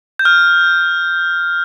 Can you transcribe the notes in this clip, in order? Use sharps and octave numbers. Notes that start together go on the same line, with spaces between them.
G6
F6